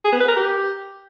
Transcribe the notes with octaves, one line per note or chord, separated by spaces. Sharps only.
G#4
B3
B4
A#4
G4